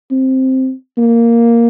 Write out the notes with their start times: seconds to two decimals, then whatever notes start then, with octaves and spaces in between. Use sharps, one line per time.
0.11 C4
0.98 A#3